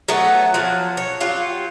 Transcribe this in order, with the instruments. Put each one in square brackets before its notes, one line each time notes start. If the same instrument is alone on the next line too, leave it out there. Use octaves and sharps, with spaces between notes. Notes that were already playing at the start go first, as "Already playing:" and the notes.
[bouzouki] F#3 A3 B3
F3 F#3
C#5
F#3 F4 G4